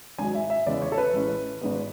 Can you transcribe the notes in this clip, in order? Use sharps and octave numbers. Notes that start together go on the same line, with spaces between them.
G#1 G#2 F#3 G#5
E5
E5
E2 C#3 G#3 B3 D5
C#5
A4
B4
A1 A2 G#3 C#4
G#1 G#2 G#3 B3